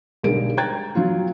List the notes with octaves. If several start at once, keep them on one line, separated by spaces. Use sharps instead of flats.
B1 D3 G3 G#3 A#4 D7
G5 A#5 F#6 G#6 A6
F#3 F4